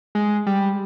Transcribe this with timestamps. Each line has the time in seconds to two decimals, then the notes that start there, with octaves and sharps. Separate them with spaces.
0.15 G#3
0.47 G3